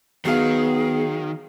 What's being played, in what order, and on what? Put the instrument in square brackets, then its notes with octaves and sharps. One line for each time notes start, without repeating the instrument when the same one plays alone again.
[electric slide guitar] D#3 [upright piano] F#3 F5 [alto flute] B3 [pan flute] G#4